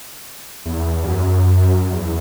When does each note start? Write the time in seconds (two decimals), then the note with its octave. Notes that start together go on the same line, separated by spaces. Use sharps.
0.66 E2
1.04 G2
1.08 F#2
1.86 F#2
1.93 E2